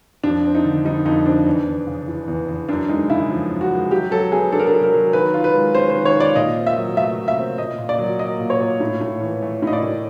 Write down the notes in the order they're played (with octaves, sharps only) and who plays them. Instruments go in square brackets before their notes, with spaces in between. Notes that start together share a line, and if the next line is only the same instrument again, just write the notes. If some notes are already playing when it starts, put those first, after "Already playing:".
[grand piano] F2 [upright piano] D4
[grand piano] C4
[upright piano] D#4
[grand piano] D3
[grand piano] G3 [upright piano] D#4
[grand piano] F2 [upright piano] D#4
[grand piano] C4 [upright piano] D4
[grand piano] E2
E2
C#3
E3
E2
E2
[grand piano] F#2 [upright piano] D4
[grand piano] G#3 [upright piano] D#4
[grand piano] C#3 [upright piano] E4
[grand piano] F3
F#2
[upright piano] F#4
[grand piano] G#3
[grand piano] F#3 [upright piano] G4
[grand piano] F#3 [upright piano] A4
[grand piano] B3 [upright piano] G#4
[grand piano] D4 [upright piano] A4
[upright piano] A#4
A4
[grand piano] F#3
[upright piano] A#4
[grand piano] F#3
[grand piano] D#3 [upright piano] B4
[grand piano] F4
[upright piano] B4
[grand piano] G#3
[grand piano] C#4 [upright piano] C5
[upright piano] C5
[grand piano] D#3
[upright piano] C#5
[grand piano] F4 [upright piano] D5
[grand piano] A#2 [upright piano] D#5
[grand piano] C4
[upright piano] E5
[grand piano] F#3
[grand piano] A3 [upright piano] E5
[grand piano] A#2
[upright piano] E5
[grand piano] C4
[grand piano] A#2 [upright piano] D#5
[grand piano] A#2
[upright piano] D5
[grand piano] F#3
[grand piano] A#3 [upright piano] D#5
[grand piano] A#2
[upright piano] C#5
[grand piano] A#2
A2
A2
E3
A3
[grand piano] A2 [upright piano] D#5
[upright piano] D5
[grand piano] A2